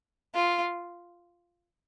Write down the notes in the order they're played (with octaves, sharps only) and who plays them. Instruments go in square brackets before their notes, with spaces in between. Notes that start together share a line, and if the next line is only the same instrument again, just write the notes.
[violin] F4